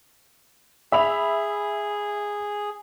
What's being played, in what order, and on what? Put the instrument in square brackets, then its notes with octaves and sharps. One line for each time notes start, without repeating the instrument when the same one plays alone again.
[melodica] G#4 [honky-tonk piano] E5 B5 F7